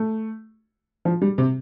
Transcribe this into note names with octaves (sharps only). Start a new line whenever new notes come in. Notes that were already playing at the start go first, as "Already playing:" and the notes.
Already playing: A3
F3
G3
C3